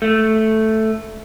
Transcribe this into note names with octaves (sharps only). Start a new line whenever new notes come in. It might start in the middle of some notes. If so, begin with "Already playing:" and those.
A3